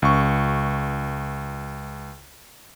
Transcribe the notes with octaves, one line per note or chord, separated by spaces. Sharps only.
C#2 C#6